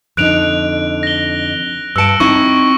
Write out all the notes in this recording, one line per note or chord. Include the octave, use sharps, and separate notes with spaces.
F2 D3 D#4 F#6 D7 F7
A#6 G7
G2 A5 E6 C#7 D7
C4 D#4 E4 C#6